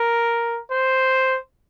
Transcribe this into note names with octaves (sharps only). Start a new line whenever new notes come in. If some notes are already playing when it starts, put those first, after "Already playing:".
Already playing: A#4
C5